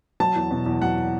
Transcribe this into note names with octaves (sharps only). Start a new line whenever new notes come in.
F#3 A5
E2
B2
E2
F#3 F#5